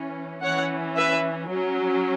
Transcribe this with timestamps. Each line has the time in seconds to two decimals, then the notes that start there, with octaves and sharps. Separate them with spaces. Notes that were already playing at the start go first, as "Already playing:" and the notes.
Already playing: E3 C#4
0.43 E3 C#4 C#5 F#5
0.96 B4 E5
1.49 F#3 C#4